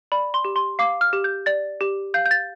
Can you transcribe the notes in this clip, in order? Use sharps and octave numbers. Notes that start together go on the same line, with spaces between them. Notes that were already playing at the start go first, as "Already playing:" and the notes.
D5 B5
C6
G4
C6
F5 D6
F6
G4
G6
D5 A6
G4
F5 G6
G6
A6